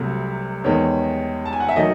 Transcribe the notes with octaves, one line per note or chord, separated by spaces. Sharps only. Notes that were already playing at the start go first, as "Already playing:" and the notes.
Already playing: C2 C3 F#3 A3
E2 D#3 G#3 C#5
A5
G#5
F#5
E5
D#3 F#3 A3 D#5